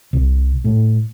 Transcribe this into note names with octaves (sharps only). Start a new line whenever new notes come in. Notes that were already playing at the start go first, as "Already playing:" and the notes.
C2
A2